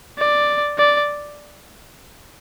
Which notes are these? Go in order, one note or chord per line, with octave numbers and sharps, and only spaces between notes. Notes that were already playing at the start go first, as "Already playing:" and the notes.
D5
D5